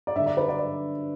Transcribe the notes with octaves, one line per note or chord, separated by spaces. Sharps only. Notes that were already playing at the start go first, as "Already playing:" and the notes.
D5
G2 D3 E5
D5
B4
D5
D5